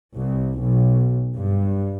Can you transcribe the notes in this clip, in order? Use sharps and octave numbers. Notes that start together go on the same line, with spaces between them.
C2
B1
G2